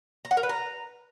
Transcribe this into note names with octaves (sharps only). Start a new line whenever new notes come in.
A#5
F#5
A#4
B4
A#5